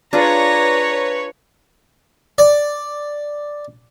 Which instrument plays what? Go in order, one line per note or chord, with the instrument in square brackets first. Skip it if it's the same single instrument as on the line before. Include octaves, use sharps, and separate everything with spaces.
[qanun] D4 F4 G#4 [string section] B4 C#5 [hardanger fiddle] A#5
[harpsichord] D5